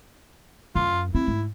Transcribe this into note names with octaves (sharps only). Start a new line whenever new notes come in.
F#2 F4
C4 E4
G#2